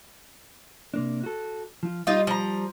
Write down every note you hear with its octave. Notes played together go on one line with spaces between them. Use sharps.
C3 A#3 D4
F#4 A4
F3 F4
G3 D#4 F4
F3 A#5